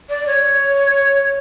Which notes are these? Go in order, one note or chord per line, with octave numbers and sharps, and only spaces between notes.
D5
C#5